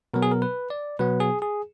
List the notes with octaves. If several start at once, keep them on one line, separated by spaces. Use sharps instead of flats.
B2 F#3 B3 A#4
G#4
A#4
B4
D5
B2 F#3 B3 B4
G#4
G#4